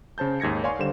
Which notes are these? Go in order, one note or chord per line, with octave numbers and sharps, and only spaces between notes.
C#3 C5 A5 G6
D#2 G#2 G#6 A#6 C#7
C#5 D5 F5 G#5 C6 C#6
D3 G3 C5 E7